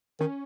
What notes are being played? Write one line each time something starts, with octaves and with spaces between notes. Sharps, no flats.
D#3 C#4